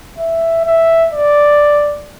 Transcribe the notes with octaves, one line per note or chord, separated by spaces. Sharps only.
E5
E5
D5